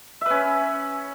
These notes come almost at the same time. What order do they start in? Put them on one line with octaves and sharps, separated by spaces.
E5 B4 C#4